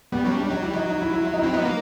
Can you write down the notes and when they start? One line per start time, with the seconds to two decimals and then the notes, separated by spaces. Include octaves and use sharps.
0.12 G3 B3
0.24 F#3 C#4
0.31 G3
0.38 D4
0.50 F#3 D#4
0.62 G3 E4
0.74 F#3 D#4
0.88 D#4
1.02 E4
1.13 E4
1.27 F4
1.33 D#4
1.39 E4
1.43 C4
1.53 B3 D#4
1.65 A#3